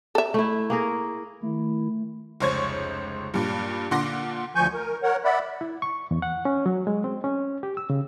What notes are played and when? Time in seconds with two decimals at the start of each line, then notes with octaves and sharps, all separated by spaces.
0.15 A4 E5
0.34 A3 E4
0.70 A#3 G#4 A#4
1.43 D#3 A3 E4
2.40 F1 C#2 C5 C#5 C#6 G#6
3.34 G2 A#2
3.91 A#2 D3 F#5 C6 D6 A#6
4.55 D2 F3 G#5 C#6 G6
4.74 A#4
5.03 A#4 C#5 F#5
5.25 D5 E5 F#5 B5
5.61 E4
5.82 C#6
6.11 E2
6.22 F#5
6.45 C#4
6.66 F#3
6.87 G#3
7.04 C4
7.24 C#4
7.63 G4
7.77 E6
7.90 C#3